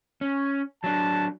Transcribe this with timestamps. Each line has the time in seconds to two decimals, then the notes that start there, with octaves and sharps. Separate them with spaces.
0.21 C#4
0.84 F#3 D4 A5